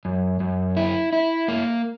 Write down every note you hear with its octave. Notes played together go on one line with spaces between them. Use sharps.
F#2
F#2
E4
E4
A#3